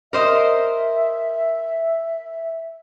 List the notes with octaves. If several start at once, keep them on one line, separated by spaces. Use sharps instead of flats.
A#4 C5 D#5 E5